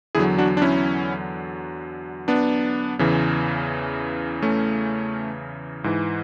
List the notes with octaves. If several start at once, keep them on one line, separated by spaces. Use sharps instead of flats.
E2 D3 F#3 E4 G#4
D4 F#4
D4
C#4 E4
B3 D4
E2 C#3 E3
A3 C#4
G#2 E3